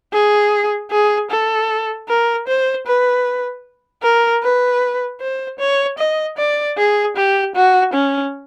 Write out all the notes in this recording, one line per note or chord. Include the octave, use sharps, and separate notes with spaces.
G#4
G#4
A4
A#4
C5
B4
A#4
B4
C5
C#5
D#5
D5
G#4
G4
F#4
C#4